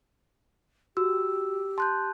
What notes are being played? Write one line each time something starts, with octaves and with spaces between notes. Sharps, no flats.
F#4 G4 E6
A5 C6 F#6 G6